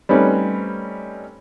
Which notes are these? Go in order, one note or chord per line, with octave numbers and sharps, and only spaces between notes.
G3 A3 C4 C#4 D#4 B4